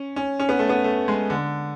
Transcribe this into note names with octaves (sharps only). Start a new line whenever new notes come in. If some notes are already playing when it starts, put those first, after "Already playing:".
Already playing: C#4
C#4
C#4
B3
A3
B3
A3
G#3
D3